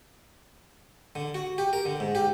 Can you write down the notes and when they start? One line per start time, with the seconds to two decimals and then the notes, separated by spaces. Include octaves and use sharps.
1.15 D3
1.34 F#4
1.58 G4
1.73 A#4
1.85 D3
2.00 G#2
2.15 G4